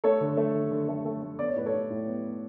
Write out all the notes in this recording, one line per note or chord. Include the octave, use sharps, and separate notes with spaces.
A3 A4 C#5
D3
A3
D3
D3
A3
A3
A3
B3 D5
C#5
A2 B4
A4 C#5
A2
A2
B3
B3